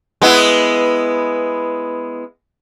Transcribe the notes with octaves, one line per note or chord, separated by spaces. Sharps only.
G#3 B3 E4